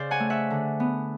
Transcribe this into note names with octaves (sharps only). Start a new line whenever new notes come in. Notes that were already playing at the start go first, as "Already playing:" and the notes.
Already playing: C#3 C5 D5
F#5 G#5
A3
E5 F#5
D3
B3